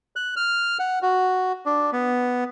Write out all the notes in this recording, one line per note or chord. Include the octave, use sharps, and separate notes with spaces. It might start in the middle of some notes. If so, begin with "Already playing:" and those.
F#6
F6
F#5
F#4
D4
B3